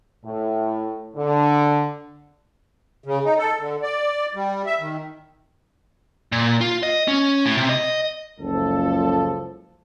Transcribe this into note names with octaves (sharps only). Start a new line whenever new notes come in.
A2
D3
C#3
D#4
A4
D3
D5
G3
E5
D#3
A#2
F4
D#5
C#4
A2
C3
D#5
F#1 C#2 F3 A4